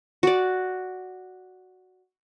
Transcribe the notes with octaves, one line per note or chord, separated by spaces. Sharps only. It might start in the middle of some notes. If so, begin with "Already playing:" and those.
F#4 D5